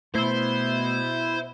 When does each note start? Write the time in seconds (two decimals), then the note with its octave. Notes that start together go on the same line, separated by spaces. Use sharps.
0.15 B2 A3 B3 E4 C5